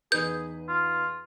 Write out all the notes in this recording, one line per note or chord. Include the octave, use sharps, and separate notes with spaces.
E2 D#4 G#4 B4 G6
F4